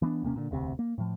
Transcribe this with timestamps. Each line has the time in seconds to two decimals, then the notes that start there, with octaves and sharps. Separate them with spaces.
0.02 E3 B3 C4 D4
0.23 D#1 C3 A#3 C#4
0.36 A#2 D3
0.51 E1 D2 C3
0.79 A#3
0.98 A2 F3